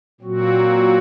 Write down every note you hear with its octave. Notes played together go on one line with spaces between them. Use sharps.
A#2 F#3 C4 F#4